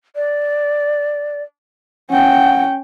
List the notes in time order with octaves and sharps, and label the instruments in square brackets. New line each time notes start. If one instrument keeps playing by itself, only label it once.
[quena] D5
[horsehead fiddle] C#4 G5 [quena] F#5